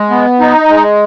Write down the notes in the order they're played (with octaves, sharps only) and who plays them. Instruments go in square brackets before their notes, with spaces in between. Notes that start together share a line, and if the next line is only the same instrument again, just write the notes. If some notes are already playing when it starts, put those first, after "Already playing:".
Already playing: [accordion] G#3
B3
D#4
G#3